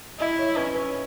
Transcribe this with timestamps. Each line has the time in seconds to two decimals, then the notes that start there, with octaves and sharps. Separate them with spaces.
0.19 E4 D#5
0.39 C#5
0.56 C#4 B4
0.75 B4